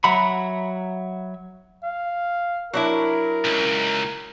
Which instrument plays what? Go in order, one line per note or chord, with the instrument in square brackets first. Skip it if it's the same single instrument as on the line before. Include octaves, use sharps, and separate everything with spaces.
[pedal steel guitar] F#3 E5 F#5 A#5 B5
[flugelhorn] F5
[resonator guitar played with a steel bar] F#3 D4 E4 [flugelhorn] A#4
[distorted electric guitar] C#2